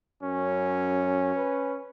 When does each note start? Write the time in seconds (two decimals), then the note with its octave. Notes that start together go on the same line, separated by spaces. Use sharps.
0.23 F#2 C#4
1.36 B4